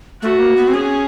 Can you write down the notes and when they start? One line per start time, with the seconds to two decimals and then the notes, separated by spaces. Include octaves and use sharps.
0.22 A3 F#4
0.39 A#3
0.56 B3
0.68 C4
0.73 C#4 G#4